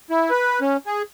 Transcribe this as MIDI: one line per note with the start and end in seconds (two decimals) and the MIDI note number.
0.10 0.30 64
0.30 0.60 71
0.61 0.77 61
0.86 1.02 68